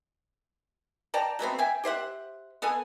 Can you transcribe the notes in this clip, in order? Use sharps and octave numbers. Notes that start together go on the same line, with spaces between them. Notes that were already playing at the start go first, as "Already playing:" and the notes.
D5 G5 A5 A#5
F#3 A3 B3 C4
E5 G5 G#5
G4 C5 E5 F#5
B3 A4 F#5 G#5